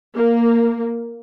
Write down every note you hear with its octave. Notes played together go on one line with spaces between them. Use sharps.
A#3